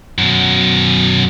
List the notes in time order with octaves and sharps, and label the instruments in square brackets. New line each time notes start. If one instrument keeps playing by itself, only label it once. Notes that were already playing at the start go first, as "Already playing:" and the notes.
[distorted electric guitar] F#2 B2